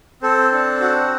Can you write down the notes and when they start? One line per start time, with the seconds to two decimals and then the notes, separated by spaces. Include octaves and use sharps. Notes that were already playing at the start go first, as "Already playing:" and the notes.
0.22 C4 A4 C5
0.52 D4
0.81 F#4